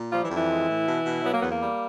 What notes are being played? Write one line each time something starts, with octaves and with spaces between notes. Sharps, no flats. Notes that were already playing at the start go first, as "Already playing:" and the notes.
Already playing: A#2
F3 G3 F4
E3 E4
F2
E3 E4
G#3
A2
B2
B2
F#3 B3
A#3
E2 B3
A#3
G3